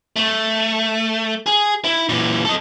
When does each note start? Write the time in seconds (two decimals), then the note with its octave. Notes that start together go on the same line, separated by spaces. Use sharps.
0.16 A3
1.46 G#4
1.84 E4
2.09 A#2 E3
2.45 A4 D#5